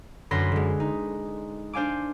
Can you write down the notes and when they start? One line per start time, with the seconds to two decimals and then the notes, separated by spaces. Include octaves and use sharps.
0.31 F#2 D3 B4 C6 A#6
0.52 D3 G#3
0.80 D#4
1.73 D4 C5 F5 G#5 D6